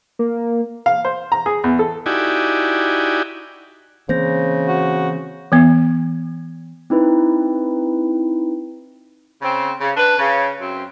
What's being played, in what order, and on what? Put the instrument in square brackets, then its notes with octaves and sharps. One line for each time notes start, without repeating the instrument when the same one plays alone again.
[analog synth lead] A#3
[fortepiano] F5
C5
A#5
G#4
E2
A4
[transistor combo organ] D#4 E4 F#4 G4 D5 G#5
[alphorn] C#3 [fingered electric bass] E3 A#3 C4 [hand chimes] C5 G6 A#6
[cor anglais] F#4
[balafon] E3 B3
[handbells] C4 D#4 E4 B4
[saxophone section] C#3 C4
C#3
D4 B4
C#3
F#2 C4